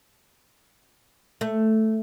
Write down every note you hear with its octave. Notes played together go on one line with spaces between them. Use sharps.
A3